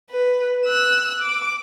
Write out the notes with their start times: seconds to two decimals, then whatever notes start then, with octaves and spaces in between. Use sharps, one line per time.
0.10 B4
0.65 E6 F#6
1.21 D6